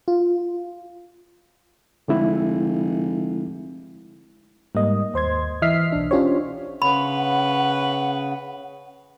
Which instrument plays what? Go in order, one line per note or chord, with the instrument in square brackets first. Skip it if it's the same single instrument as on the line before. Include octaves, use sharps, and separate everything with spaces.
[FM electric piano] F4
[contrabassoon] F1 [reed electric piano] D3 G#3 E4
[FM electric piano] G#2 G3 A#3 D#5
D#2 C5 C6 G#6
E3 D#5 E5 F6 B6 C7
B1 D4
C#4 D4 F4 G4 C5 C#5
[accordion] C#3 [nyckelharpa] B4 C#5 [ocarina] F#5 [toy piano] B5